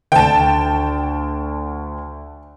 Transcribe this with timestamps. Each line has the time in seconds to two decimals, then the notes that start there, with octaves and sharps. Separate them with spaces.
0.12 D2 D3 G5 A5